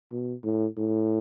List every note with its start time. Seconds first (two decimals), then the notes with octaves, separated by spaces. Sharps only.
0.12 B2
0.44 A2
0.77 A2